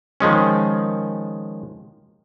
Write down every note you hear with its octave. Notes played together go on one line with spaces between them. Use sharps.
D#3 F3 G#3 C#4